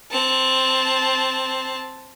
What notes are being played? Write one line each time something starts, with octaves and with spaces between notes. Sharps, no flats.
C4 A5